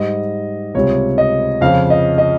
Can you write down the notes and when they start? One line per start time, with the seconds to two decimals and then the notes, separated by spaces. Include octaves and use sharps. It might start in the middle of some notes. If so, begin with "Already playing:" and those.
Already playing: G#2 G3 D#5
0.74 C#2 C3 G3 C#5
1.18 D#5
1.61 F2 C#3 F3 F5
1.90 D#5
2.18 D#5